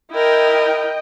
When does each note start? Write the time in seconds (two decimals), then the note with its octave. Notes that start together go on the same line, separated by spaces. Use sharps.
0.11 E4 A#4 D#5 G5